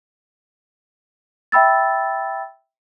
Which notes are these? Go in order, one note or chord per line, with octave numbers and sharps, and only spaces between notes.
E5 G5 B5 E6 A6